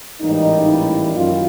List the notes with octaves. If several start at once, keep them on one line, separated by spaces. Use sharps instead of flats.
A1 G#2 E3 G3 A#3 D#4
E4
F#2 D#3 F4